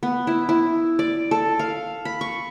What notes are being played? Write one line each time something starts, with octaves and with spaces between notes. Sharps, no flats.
B3
E4
E4
D5
A4
F5
B5
C#6